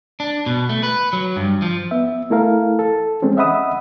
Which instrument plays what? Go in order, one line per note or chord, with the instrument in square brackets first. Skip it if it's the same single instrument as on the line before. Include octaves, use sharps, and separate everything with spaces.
[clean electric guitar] D4
B2
A3
B4
F#3
G2
F3
[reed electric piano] B3 E5
A3 E4 A4 A#4 F5
A4
E3 G#3 C4 C#4
D#5 E5 F#5 B5 D#6 E6